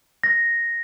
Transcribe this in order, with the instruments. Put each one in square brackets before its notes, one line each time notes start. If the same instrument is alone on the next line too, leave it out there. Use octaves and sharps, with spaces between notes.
[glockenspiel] A#6